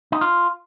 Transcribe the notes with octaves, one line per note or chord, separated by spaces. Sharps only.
D#4
F4